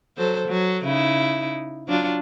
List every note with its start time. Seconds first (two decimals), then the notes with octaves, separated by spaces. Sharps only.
0.17 F#3 A4 C5
0.47 F#3
0.84 C#3 D#4 E4
1.87 F#3 D4 F4